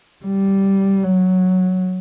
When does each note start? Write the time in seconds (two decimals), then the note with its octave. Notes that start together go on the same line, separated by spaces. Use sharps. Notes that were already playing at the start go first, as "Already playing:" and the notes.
0.25 G3
1.03 F#3